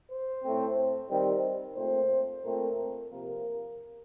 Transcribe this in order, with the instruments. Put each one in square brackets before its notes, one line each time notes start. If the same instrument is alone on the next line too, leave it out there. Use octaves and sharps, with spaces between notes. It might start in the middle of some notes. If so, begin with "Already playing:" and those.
[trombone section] C5
A2 A3 C4
D#3 G3 C4
A#2 A3 C4 C5
A#2 A3 C4 A#4
C3 F3 A#3 A#4